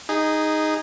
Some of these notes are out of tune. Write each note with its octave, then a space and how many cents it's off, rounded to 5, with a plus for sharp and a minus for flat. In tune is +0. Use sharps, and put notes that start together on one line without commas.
D#4 +0 G#4 -15